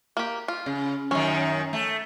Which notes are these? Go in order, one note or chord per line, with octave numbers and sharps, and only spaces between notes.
A#3 G4
F4
C#3
F#2 D#3 C#4
A3